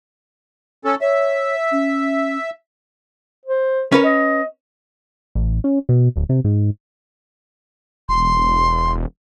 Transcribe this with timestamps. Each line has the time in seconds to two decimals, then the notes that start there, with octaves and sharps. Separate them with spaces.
0.85 C#4 A4
1.01 C#5 E5
1.72 C#4
3.46 C5
3.92 C#4 A#4 B4 C#5
4.05 D#5
5.35 A1
5.64 C#4
5.89 B2
6.16 D1
6.29 C3
6.44 G#2
8.09 E1 C6